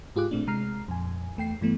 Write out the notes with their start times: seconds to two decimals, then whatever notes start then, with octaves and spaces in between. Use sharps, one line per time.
0.16 G#2 F4 G4 G#4 D6 F#6
0.31 A1 A#2 A3 C4 D4
0.47 C3 G#3 A#5 F6 C7
0.88 F2 A#2 G#5
1.37 E2 A3 G5 C7
1.61 G2 E3 A3 B3